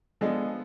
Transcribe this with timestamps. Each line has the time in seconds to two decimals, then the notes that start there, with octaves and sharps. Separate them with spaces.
0.21 F3 G#3 B3 D4 A4